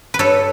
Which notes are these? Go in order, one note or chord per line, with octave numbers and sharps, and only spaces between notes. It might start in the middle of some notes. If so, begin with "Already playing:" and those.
B4
G2 A4 C#5